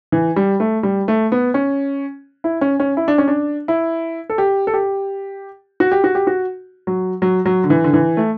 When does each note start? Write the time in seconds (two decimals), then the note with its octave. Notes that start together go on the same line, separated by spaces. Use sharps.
0.12 E3
0.36 G3
0.60 A3
0.83 G3
1.08 A3
1.32 B3
1.54 C#4
2.44 E4
2.61 C#4
2.80 C#4
2.97 E4
3.08 D4
3.18 C#4
3.28 D4
3.68 E4
4.30 A4
4.38 G4
4.67 A4
4.74 G4
5.80 F#4
5.92 G4
6.04 F#4
6.15 G4
6.27 F#4
6.87 F#3
7.22 F#3
7.46 F#3
7.64 D3
7.70 E3
7.84 D3
7.93 E3
8.17 A3